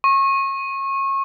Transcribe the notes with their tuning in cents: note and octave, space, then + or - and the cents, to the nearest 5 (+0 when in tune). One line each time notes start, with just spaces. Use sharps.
C#6 -30